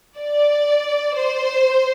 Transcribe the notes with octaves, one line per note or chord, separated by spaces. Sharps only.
D5
C5